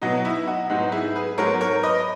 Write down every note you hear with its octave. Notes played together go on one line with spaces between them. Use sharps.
B2 F#3 B3 D#4 F#4
E4
D#4 F#4
G#2 F#3 B3 D#4 F#4
E4 G#4
G#4 B4
G#2 F#3 B3 A#4 C#5
A#4 C#5
B4 D#5